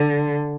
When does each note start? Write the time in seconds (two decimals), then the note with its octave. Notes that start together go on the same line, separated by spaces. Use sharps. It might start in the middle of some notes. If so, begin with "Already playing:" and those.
Already playing: D3